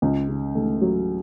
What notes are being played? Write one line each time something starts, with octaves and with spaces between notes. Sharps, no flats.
C#2
C#3
A3
F#3